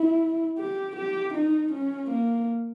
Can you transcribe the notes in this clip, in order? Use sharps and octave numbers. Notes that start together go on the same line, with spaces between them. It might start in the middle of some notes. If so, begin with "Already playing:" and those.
Already playing: E4
G4
G4
D#4
C#4
A#3